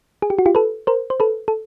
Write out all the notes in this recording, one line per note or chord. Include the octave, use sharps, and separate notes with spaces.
G#4
G4
F#4
F4 G4
A4 B4
A#4 C5
C5
A4 B4
A4